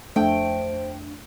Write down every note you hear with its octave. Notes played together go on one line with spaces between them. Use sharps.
F2 A3 D4 C5 G5